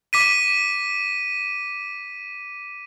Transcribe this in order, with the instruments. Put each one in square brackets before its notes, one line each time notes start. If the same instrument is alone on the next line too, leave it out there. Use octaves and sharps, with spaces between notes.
[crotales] D6 B6 D#7